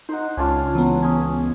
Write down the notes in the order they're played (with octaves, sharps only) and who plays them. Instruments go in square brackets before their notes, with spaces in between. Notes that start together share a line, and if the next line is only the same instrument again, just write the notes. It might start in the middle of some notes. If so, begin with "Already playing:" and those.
[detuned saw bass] D#4 [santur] C5 F#5
[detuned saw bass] C#2 [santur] C#4 D4 F4
[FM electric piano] E3 B3 [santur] F#3
[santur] C#4 G#4